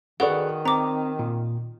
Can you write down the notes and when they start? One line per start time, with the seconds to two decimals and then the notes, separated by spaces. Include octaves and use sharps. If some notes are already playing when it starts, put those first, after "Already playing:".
0.20 D#3 F#4 G#4 A4 B4 D5 F#5 C#6
0.65 C4 A#5 D6
1.19 A#2